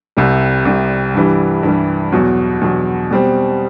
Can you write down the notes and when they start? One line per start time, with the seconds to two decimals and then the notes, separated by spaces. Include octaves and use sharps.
0.17 C2 C3 G3
0.65 C2 C3 G3
1.14 G2 E3 G3
1.63 G2 E3 G3
2.12 E2 B2 F#3
2.61 E2 B2 F#3
3.11 B2 G3 C4